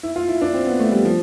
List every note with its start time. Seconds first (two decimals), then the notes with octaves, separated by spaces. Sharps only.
0.03 E4
0.16 F4
0.28 E4
0.42 D4
0.54 C4
0.67 B3
0.79 A3
0.92 G3
1.05 F3